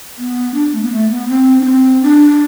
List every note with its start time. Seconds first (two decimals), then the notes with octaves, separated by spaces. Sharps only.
0.18 B3
0.54 D4
0.73 A3
0.83 B3
0.92 A3
1.10 B3
1.29 C4
1.61 D4
1.65 C4
2.03 D4